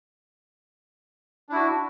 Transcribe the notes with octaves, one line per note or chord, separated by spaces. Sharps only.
D4 E4 F#4